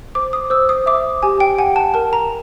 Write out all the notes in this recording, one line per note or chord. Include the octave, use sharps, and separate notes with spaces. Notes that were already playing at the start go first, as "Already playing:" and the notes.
C5 D6
D#6
C5 E6
D#6
E5 D6
G4 G#5
G5
F#5 G#5
A5
A#4 A5
A#5